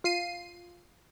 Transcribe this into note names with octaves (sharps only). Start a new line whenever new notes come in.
F4 C7 D#7